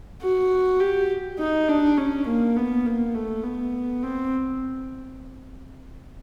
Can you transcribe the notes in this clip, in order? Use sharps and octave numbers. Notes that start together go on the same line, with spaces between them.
F#4
G4
D#4
D4
C#4
A#3
B3
A#3
A3
B3
C4